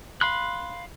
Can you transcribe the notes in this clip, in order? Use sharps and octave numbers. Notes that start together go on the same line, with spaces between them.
F5 B5 C6 F#6